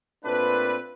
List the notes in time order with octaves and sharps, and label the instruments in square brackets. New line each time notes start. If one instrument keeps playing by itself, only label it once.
[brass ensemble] A#2 A3 C4 D4 B4